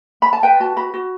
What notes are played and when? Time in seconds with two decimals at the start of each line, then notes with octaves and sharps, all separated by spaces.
0.22 B5
0.33 A5
0.43 B4 G5
0.60 F#4 A5
0.76 F#4 B5
0.94 F#4